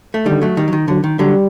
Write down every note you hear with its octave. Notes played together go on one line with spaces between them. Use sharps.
A3
D3 D#3 G3
F#3 A3
D#3 G3
F#3
D#3
D3 F#3
D#3
D3 F#3 G3